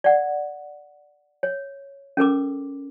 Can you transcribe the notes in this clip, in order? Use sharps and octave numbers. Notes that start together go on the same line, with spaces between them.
D5 F#5
C#5
C#4 A4 A#4 D6